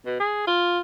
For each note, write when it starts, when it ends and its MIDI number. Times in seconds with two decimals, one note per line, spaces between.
0.06 0.18 47
0.20 0.42 68
0.47 0.80 65